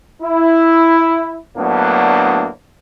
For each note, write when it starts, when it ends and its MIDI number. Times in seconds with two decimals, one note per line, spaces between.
0.22 1.38 64
1.57 2.47 38
1.57 2.47 45
1.57 2.47 54
1.57 2.47 58
1.57 2.47 59
1.57 2.47 62